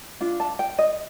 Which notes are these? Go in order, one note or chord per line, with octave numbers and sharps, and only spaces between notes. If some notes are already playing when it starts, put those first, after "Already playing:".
D4 F4
A5
G5
D#5